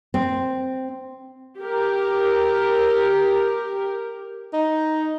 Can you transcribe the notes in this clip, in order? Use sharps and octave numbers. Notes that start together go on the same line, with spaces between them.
C4
G4 A#4
D#4